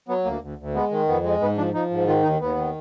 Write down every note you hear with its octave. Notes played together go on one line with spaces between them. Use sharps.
F#3 B3
D2 A#3
D2
D2
G#3 B3
D#3
F2 B3
G#3
G#2 B3
F3 D4
F3 D#4
G#2
D#3 F4
D#2 D#4
D#2 B3
D#3